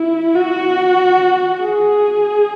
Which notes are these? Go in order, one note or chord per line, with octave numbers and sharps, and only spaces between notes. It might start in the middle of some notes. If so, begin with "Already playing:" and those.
Already playing: E4
F#4
G#4